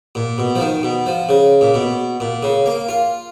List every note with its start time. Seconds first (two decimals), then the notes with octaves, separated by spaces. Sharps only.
0.15 A#2
0.38 B2
0.55 F3
0.60 D#3
0.83 B2
1.06 F3
1.29 C#3
1.61 A#2
1.74 B2
2.20 A#2
2.43 C#3
2.66 A#3
2.89 F4